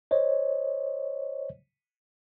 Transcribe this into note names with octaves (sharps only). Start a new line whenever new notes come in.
C5 C#5 D#5